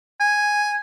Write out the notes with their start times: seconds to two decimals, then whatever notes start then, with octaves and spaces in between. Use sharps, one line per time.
0.20 G#5